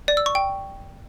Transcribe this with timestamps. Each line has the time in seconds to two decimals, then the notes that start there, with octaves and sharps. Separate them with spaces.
0.08 D5
0.17 E6
0.26 C#6
0.35 G5